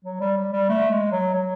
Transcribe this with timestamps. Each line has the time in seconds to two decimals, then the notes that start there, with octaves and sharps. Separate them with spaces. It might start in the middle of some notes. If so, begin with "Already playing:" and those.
0.05 F#3
0.21 G3
0.37 G3
0.52 G3
0.69 A3
0.91 G#3
1.12 F#3
1.34 F#3